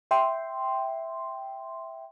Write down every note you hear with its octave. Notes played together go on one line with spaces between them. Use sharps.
E5 G5 C6